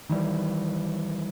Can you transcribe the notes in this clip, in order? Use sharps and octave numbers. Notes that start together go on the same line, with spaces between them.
D#3 E3 G3